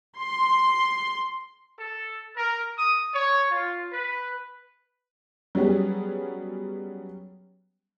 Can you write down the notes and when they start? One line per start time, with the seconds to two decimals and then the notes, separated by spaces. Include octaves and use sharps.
0.19 C6
1.79 A4
2.37 A#4
2.78 D#6
3.15 C#5
3.51 F4
3.93 B4
5.55 F#3 G3 B3 C#4 G#4